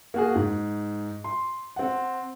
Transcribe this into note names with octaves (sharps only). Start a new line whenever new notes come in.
A#3 F#4 G#4
G#2
C6
C4 F#5